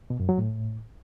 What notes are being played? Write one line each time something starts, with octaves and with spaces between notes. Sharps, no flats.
B2
F#2
F#3
A2